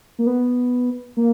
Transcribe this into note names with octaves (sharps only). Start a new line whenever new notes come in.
A#3
B3
A#3